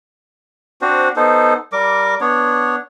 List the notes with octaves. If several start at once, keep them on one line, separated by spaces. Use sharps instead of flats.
C4 D4 F#4 C5
B3 D#4 A4 C5
G3 A#4 D6
B3 D4 C#5